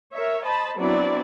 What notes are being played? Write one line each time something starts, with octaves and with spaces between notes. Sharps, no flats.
A#4 C#5 E5
C5 D#5 A5 B5
F#3 B3 C4 D4 E4 D5